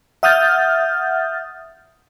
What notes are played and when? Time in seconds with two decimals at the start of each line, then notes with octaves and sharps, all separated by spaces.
0.23 E5 F#5 D#6 F6 G6 A6